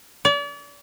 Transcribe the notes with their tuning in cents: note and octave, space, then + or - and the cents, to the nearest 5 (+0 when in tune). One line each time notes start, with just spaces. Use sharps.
D5 -40